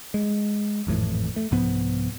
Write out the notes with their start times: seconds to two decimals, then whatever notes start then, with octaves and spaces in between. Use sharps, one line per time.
0.14 G#3
0.87 G#1 F2 A2 E3
1.36 A3
1.51 C2 G#2 F3 B3